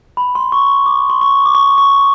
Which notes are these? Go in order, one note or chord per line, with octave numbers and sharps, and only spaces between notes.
B5
C6
C#6
D6
C6
C#6
D6
C#6
C#6